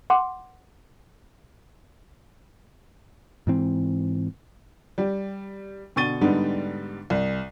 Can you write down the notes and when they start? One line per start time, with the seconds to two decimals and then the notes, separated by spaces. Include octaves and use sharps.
0.10 F#5 C6 D6
3.47 G#2 E3 C4
4.98 G3 G4
5.96 B2 D3 C#6 A6 D#7 G7
6.21 G#2 D3 G3 B3 D4 D#4
7.10 C2